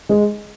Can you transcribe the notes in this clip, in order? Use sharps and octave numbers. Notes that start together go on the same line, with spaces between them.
G#3